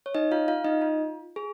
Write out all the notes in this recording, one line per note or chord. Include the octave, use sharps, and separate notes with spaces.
C#5
D#4 D#5
F4 F5
F4 F5
D#4 D#5
F4
G#4